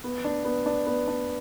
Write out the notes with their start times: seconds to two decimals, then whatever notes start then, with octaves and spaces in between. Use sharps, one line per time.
0.04 B3
0.25 D4
0.45 B3
0.66 D4
0.86 B3
1.08 D4